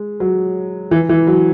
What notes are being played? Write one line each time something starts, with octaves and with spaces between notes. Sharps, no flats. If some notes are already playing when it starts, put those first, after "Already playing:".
Already playing: G#3
F#3
E3
E3
F#3